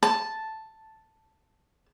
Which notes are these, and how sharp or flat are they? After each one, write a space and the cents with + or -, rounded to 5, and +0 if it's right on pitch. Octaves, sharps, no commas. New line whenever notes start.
A5 +0